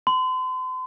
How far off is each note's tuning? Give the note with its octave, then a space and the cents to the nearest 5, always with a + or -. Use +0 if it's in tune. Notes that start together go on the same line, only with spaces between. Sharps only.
C6 -40